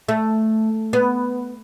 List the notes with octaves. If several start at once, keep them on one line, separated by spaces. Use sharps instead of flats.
A3
B3